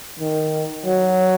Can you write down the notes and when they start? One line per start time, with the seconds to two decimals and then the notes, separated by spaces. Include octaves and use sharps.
0.20 D#3
0.86 F#3